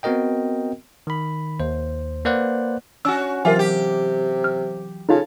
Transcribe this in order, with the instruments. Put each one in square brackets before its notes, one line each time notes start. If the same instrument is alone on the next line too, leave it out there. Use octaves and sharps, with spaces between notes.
[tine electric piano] B3 C4 F#4 A#4 D#5 G5
D#3 B5
D#2 C5
A#3 B4 C5 D5 F#5 F#6
[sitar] C#4 F#4 [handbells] E6
[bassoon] C3 [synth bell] E3 F#3 D6 [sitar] F4 [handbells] A#4 E5 G#5
[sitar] G4
[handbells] F6
[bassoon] C#3 [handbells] D#4 F4 [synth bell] A4 F5 A5